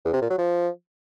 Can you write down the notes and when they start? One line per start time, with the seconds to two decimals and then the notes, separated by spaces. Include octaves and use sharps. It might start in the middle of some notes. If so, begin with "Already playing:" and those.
0.05 E2
0.13 C3
0.21 A#2
0.30 F#3
0.38 F3